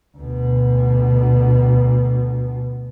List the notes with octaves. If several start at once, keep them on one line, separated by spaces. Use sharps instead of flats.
D2 B2